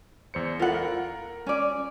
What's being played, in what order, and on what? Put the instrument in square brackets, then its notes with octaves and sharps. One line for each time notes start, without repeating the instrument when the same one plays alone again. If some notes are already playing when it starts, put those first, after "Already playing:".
[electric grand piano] E2 C5 C#7
[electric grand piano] E4 A4 A#4 [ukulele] F4 F#5
[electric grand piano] A#4
[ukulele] C#4 D5